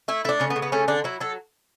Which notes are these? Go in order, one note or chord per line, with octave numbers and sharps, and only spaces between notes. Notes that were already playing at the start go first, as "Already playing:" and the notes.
A3 E4
A3 D4 E4
C#3 C#4
B3
C#3
B3
A3 C#4
D3 D4
F#3 E4
F#3 A4